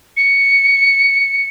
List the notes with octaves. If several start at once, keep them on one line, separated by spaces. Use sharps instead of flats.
C#7